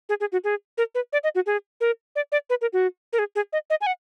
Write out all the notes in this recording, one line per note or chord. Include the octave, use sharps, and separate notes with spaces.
G#4
G#4
F#4
G#4
A#4
B4
D5
D#5
F#4
G#4
A#4
D5
D5
B4
A#4
F#4
A#4
G#4
G#4
D#5
D#5
G#5
F#5